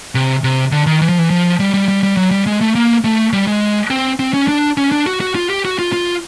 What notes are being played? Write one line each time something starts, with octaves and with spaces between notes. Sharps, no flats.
C3
C3
D3
D#3
E3
F3
E3
F3
G3
G3
G3
G3
F#3
G3
G#3
A3
A#3
A3
G3
G#3
C4
C4
C#4
D4
C#4
D4
F#4
F#4
F4
G4
F#4
F4
F4